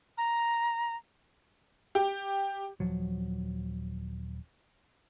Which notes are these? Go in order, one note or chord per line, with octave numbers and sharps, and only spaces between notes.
A#5
G4
D#1 F3 F#3